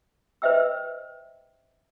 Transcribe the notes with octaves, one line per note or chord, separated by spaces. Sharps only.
B4 C5 D#5 E5 G5 E6